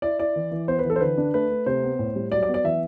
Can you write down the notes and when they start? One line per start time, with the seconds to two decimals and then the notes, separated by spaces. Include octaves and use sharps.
0.02 E4 D5
0.19 E4 D5
0.36 E3
0.52 E3
0.68 B3 C5
0.79 B4
0.85 E3 A4
0.96 C5
1.01 D3 B4
1.18 D4
1.34 A3 B4
1.50 A3
1.66 C3 C5
1.83 B3
1.99 A2
2.16 G3
2.32 F#3 D5
2.43 D5
2.48 B3
2.54 D5
2.64 E3 E5